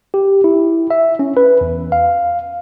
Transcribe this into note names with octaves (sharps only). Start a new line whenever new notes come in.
G4
E4
E5
C#4
B4
E2
F5